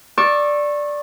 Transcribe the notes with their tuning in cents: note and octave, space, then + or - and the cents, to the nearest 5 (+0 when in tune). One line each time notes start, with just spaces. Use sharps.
D5 +0 C#6 -25 E6 +10